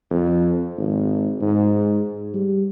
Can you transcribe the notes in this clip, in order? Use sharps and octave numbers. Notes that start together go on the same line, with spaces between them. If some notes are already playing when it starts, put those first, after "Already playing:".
F2
G#1
G#2
G3